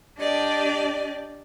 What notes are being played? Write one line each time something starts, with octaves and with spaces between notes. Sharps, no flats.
D4 G4 D5 D#5